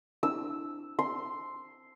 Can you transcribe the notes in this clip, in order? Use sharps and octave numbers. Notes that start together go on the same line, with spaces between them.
D4 E4 E6
C6